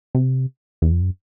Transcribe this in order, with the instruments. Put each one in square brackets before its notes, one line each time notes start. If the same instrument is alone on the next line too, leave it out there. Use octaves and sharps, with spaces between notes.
[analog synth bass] C3
E2
F2
F#2